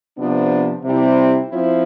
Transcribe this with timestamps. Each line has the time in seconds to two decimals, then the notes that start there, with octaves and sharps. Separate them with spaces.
0.17 C3 F3 B3 D4
0.82 C3 G3 C4 E4
1.49 F3 C4 E4